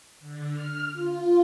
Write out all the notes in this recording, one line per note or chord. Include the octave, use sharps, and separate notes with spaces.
D3
F6
F4